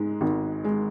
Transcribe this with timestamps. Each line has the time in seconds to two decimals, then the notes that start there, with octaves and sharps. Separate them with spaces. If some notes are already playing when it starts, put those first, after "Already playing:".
Already playing: G#2 G#3
0.21 G#1
0.64 G#3